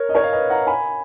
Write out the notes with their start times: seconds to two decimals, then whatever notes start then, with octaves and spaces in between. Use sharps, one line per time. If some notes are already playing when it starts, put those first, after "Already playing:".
Already playing: A#4 C#5
0.09 D#5
0.15 A#4 C#5
0.23 F5
0.32 B4 D#5
0.50 F#5 A#5
0.67 G#5 B5